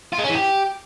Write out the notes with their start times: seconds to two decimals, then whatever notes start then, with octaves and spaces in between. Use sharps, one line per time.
0.13 F4
0.18 G#3
0.24 C#4
0.29 E3
0.35 G4